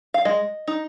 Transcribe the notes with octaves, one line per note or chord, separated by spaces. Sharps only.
F5
G#3 D#5
D#4